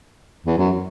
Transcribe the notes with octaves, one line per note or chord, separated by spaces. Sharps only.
E2
F#2